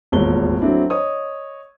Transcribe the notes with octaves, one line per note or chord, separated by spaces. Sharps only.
D#1 G#1 E2 G#3 C#5 G7
F#3 A3 C4 D4 E4
C#5 D#5 D#6